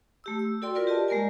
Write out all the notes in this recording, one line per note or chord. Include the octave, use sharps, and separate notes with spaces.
A3 G4 E6
E6
F#4 A4 D5 G5 C6
F4 A#4 B4 D5
G4 D#5 A5
G#3 A#3 A#4 D5 G#5